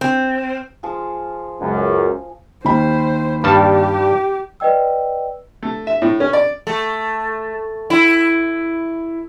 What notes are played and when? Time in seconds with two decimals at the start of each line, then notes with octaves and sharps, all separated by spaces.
0.01 C4
0.83 F3 G#4
1.61 C#2 F#2
2.65 D#2 D#4 C5 B5
3.44 G2 G3 G4 A5
4.60 B4 D5 D#5 G5 E6
5.63 A3
5.87 E5
6.02 A2
6.20 C#4
6.33 D5
6.67 A3
7.90 E4